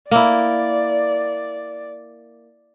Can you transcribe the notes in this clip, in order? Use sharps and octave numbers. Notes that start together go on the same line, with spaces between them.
A#3 E4 D5